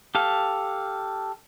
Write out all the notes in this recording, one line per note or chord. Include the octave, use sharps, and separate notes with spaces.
G4 A4 F5